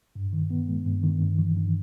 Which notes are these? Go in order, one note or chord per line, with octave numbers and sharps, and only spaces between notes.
G2
D#3
B3
G#3
G2
D#3
G2
E3
G2